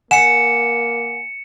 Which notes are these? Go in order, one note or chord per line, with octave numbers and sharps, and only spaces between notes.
A#3 F#5 G#5 C#7 E7